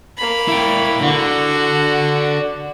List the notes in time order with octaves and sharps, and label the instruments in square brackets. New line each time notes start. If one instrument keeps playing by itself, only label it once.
[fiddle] A#3 B5
[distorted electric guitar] E4 G5
[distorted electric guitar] D3 [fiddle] F#4